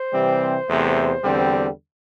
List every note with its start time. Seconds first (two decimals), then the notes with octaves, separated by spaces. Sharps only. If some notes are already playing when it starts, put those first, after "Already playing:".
Already playing: C5
0.13 C3 E3 G3 C4
0.68 E2 C3 A3
1.24 E2 D3 G3 C4